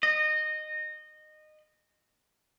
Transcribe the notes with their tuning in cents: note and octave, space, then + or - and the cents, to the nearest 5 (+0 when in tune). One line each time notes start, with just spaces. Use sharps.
D#5 -20